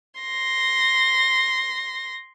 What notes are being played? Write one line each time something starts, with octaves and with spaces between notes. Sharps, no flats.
C6 A#6